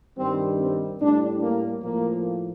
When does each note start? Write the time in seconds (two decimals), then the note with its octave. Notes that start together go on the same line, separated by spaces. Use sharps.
0.17 G2 D#3 G3 C4
0.60 C4
1.00 A2 G3 D4
1.42 A#3
1.82 A2 F3 A#3